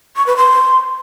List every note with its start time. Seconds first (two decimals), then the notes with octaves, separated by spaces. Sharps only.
0.16 C#6
0.26 B4
0.37 C6